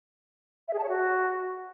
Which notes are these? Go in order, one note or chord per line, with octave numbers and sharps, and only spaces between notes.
E5
G#4
A5
C#5
F#4